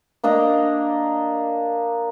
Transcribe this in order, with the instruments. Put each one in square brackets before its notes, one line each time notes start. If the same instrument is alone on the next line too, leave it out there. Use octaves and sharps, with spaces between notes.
[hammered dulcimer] A#3 D4 D#5 A#5